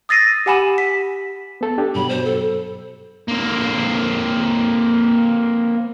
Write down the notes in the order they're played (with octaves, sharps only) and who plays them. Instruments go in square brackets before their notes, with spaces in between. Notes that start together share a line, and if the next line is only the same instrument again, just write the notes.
[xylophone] D#6 E6 A6 A#6 C7 D#7
G4 F#5 G#5 B5 E7
B6
[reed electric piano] B3 A4
D4 G4
[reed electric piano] G2 B2 F#3 [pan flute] B5
[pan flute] C5
A4
[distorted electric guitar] A#3 C4